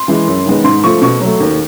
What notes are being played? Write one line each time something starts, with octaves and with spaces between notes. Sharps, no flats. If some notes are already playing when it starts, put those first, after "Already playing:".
Already playing: C6
E3 G#3
F#2
D#3 G#3 B3
G#2 C6
F3 A3 C#6
B2 C#6
F#3 A3
D#2